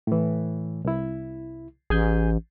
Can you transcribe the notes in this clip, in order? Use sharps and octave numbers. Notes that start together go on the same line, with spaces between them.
A2 E3
C2 E4
A1 G#4 G#5 G6